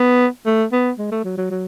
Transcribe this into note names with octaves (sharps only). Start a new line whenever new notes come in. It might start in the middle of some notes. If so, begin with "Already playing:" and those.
Already playing: B3
A3
B3
G#3
A3
F#3
F#3
F#3